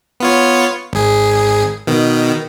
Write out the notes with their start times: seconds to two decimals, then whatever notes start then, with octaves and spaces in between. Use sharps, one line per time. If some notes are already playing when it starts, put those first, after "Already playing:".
0.20 B3 F4 C#5
0.93 G#1 G#4
1.87 B2 D#3